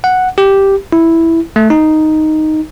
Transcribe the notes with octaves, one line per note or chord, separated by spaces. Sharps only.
F#5
G4
E4
A3
D#4